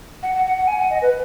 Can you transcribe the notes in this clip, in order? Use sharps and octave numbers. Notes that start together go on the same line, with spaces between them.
F#5
F#5
F#5
F#5
G#5
F#5
D#5
B4